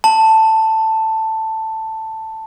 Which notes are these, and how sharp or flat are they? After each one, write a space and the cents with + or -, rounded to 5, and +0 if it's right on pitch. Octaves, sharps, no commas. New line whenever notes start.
A5 +10